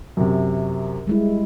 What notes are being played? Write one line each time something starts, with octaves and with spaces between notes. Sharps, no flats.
F#2 C3
G3 G#3 E4